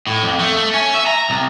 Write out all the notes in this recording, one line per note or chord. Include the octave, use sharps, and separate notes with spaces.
A2
F2
A3
A3
C#4
E5
A#5
C2